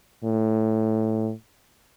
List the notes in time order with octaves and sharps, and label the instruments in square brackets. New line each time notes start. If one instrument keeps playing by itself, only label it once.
[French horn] A2